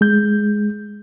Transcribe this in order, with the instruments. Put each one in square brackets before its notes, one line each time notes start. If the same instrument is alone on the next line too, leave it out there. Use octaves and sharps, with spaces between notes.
[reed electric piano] G#3 G6